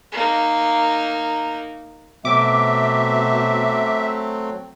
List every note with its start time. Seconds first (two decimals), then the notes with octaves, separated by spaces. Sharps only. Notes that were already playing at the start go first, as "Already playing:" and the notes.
0.12 A#3 D#4
2.25 B2 F#3 A3 C4 E5 D6